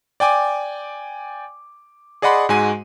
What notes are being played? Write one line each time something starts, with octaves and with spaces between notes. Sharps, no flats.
D5 G5 G#5 D6
G#4 D5 D#5 F#5 B5 C6
G#2 G#3 F#4 G#5 D#7